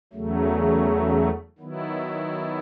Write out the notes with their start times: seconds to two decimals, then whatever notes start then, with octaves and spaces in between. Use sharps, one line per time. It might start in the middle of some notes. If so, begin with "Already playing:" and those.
0.13 E2 C#3 F#3 A3
1.58 D#3 F#3 B3 E4